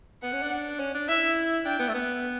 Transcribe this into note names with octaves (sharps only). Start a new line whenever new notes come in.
B3 F#5
C#4
D4
C#4
D4
E4 E5
D4 G5
B3
A3
B3